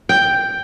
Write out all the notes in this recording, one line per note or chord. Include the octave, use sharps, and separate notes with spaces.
G5